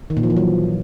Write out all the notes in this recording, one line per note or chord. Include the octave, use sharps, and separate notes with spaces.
D#3
A#2
F3
E3
F#3